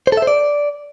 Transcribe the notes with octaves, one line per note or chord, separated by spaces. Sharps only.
C5
A4
E5
C5
D5